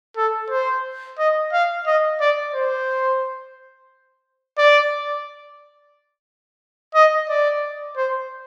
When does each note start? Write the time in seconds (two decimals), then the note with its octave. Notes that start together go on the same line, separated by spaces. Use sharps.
0.17 A4
0.50 C5
1.19 D#5
1.53 F5
1.87 D#5
2.21 D5
2.55 C5
4.58 D5
6.95 D#5
7.29 D5
7.97 C5